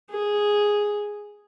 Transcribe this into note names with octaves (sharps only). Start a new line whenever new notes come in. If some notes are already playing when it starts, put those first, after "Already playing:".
G#4